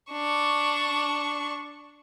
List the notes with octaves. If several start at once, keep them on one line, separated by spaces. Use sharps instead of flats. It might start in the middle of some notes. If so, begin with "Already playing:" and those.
D4 C#6